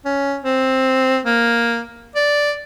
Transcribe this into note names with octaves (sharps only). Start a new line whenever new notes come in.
C#4
C4
A#3
D5